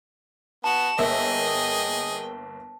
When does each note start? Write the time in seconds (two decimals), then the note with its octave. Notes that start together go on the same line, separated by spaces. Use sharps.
0.64 B3 F#4 A5 E7
0.98 G1 A#3 G#4 D#5 E5 G5